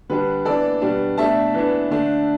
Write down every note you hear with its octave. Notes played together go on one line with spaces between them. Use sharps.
D3 G3 D4 B4
E3 B3 D4 A4 D5
B2 G3 B3 D4
B2 A3 D4 E5 A5
E3 B3 D4
D3 A3 D4